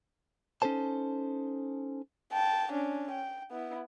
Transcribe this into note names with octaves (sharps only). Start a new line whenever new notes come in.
C#4 D#4 A4 C5 A5
G5 A5
C#4 D4
G5
B3 E4